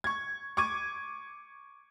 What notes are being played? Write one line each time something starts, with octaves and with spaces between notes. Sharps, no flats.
C#6 G#6
C#6 D6 G#6 D#7